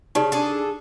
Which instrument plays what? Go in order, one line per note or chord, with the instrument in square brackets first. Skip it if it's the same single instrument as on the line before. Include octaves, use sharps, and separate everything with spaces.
[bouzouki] C#3 [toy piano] D#4 G4 D5
[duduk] D4 [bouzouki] G#4 A4